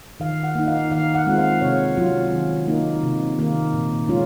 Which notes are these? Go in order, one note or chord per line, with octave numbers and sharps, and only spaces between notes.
D#3 F5
F#5
A#3 D#4
F5
D#3 F5
F#5
G#3 C4 F4
F5
C3 C#5
F#3 C#4 F4
D#3
A#3 D#4
C3
D#3 A#3
A#2
G#3 C#4 F4